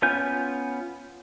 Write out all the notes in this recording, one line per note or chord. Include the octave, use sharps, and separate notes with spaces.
B3 C#4 F4 G#5 G6